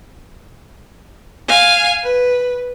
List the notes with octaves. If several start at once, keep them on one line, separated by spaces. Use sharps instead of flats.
F5 G#5
B4